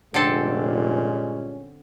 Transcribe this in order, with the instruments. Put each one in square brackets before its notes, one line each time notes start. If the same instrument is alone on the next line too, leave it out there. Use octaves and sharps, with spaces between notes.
[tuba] F1 [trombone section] G2 G#3 C#4 [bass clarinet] A#2 [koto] D3 C4 A4